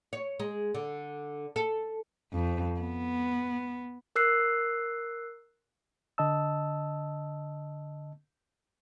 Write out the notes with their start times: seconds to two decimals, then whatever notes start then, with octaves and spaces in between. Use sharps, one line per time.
0.13 C#5
0.39 G#3
0.74 D3
1.56 A4
2.33 F2
2.80 B3
4.16 A#4 E6 F#6 C7
6.18 D3 D#5 A5 E6